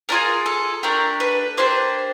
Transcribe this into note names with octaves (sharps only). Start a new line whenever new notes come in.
A3 D4 F4 G#4 A#4
A4
A3 D4 G4 A#4
B4
A#3 D4 G4 C5